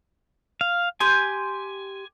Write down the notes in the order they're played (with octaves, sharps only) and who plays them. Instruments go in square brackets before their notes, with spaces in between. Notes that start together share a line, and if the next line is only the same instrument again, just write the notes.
[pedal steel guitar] F5
[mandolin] G4 C6 D#6 [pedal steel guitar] G#5